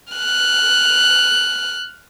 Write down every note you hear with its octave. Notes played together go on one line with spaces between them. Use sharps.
F6 F#6